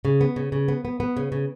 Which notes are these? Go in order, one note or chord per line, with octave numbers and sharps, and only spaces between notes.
C#3
B3
C#3
C#3
B3
B3
B3
C#3
C#3